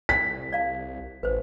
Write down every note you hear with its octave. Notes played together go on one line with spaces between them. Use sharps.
C2 D5 B6
D5 F5 A5
A1 B4 C5